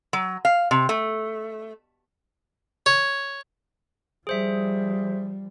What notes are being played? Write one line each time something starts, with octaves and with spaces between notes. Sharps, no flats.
F#3
F5
C3
A3
C#5
F3 G3 G#4 C5 E5